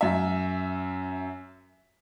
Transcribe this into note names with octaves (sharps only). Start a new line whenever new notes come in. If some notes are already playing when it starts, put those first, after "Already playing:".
F#2 E5